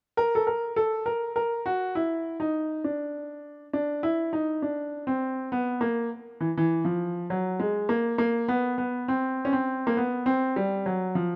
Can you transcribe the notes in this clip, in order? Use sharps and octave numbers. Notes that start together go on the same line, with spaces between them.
A#4
A4
A#4
A4
A#4
A#4
F#4
E4
D#4
D4
D4
E4
D#4
D4
C4
B3
A#3
E3
E3
F3
F#3
G#3
A#3
A#3
B3
B3
C4
C#4
C4
A#3
B3
C4
G3
F#3
F3